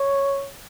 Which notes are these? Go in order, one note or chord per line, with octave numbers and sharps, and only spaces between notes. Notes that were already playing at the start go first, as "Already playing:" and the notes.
Already playing: C#5